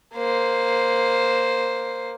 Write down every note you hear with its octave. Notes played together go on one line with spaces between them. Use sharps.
A#3 C5